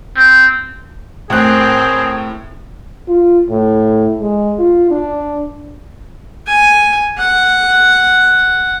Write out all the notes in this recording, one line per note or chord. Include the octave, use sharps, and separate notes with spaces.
C4
A2 C4 G#4 A#4 F#6
F4
A2
G#3
F4
D4
G#5
F#5